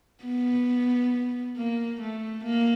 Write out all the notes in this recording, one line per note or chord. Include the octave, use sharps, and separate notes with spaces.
B3
A#3
A3
A#3